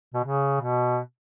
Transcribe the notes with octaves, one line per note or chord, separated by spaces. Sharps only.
B2
C#3
B2